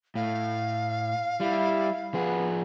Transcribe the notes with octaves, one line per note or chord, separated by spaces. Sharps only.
A2 F5
G3 E4
F3 B3 G#4